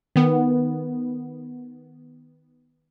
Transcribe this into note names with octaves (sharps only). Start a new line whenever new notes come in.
D#3 B3